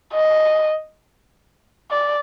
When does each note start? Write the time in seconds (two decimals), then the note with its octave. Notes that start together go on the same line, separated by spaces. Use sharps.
0.14 D#5
1.91 D5